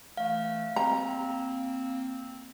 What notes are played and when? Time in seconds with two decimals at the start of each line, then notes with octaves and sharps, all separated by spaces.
0.17 E3 A3 F5
0.76 A#3 C4 A#5